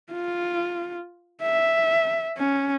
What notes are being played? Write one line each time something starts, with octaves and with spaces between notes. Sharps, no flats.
F4
E5
C#4